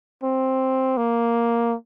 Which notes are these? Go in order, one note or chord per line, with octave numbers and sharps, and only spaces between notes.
C4
A#3